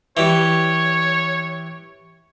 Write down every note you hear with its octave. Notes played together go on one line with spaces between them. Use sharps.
E3 G3 C#5